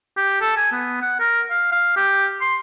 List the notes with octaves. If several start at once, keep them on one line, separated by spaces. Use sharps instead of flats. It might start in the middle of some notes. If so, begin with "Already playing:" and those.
G4
A4
G#5
B3
F#5
A#4
F5
F5
G4
C6